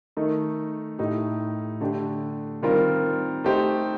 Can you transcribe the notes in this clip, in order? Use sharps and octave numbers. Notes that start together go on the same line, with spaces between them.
D#3 A3 D#4
A2 A3 D#4 G4
D3 A3 D4 G4
D#3 G3 C4 F4 A#4
A3 D#4 G4 C5